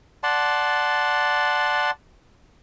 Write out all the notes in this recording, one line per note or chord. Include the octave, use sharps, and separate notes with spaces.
D5 F#5 A5 C6